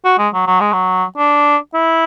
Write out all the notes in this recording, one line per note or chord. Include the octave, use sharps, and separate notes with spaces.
F#4
G#3
F#3
F#3
G#3
F#3
D4
E4